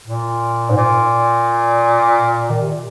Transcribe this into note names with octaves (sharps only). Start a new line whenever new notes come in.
A#2
G#2
A#2
D#3
C3
A#2